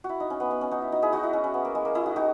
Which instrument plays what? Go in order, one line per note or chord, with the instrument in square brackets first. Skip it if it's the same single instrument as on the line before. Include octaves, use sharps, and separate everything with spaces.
[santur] F#4
E4
D#4
C#4
B3
B3
C#4
D#4 F#4
E4
D#4 F#4
E4 G#4
D#4 F#4
E4
C#4
C#4
B3
A#3
G#3
A#3
E4 G#4
D#4 F#4
D#4 F#4